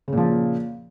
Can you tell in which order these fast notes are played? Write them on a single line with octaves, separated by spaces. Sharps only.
C#3 A#2 F3